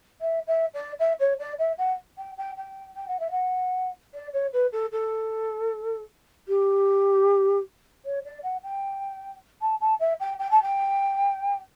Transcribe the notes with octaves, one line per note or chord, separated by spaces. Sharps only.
E5
E5
D5
E5
C#5
D5
E5
F#5
G5
G5
G5
G5
F#5
E5
F#5
D5
C#5
B4
A4
A4
G4
C#5
D5
F#5
G5
A5
A5
E5
G5
G5
A5
G5